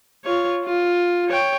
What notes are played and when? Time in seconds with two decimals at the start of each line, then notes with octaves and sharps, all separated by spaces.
0.24 F4 C#5
0.64 F4
1.28 C#5 G5